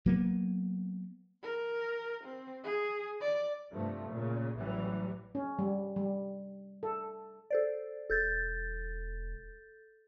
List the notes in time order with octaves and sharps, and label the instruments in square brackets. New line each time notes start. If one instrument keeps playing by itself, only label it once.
[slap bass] F#3 A#3 B3
[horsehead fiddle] A#4
C4
G#4
D5
[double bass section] G2 C3 F3 A3
A#2 C#3
A1 E3 F#3 G3
[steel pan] C#4
G3
G3
A4
[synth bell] A4 C5 D5
[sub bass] E1 [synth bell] A4 G6 A6